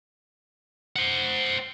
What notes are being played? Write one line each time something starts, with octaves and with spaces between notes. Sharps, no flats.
C5 F#5